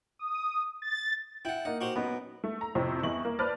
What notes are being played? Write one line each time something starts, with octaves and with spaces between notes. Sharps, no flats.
D#6
A6
E4 F#5 G5
A#3 D#4 F#5
F#4 G4 C5
F#2 B3 D#4
A3
A#5
F2 A2 C3 F3 C4
E2 E4 D#5 C#6 F#7
A#3
B4 C5 D5 A5 F6 A6